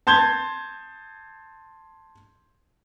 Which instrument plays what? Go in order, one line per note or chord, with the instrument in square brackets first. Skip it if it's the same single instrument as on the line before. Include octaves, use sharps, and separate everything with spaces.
[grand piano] A5 C6 G6 G#6 G7